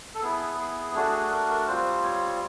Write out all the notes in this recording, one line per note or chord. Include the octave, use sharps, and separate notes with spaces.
A4
B3 E4 G#4
G#4
A3 D4 F#4 G#4
G#4
A#4
A#4
G3 C4 F4 C5
C#5